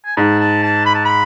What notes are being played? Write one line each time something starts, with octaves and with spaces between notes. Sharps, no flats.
G#5
G#2 A5
A5
A5
B5
A5
B5